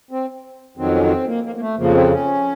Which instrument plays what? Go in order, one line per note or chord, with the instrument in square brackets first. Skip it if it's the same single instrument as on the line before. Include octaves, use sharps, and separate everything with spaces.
[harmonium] C4
F2 D#3 F#3 C4
C#4
C4
A#3
A#3
A#3
A3
F2 C#3 F3 A#3
C4
C#4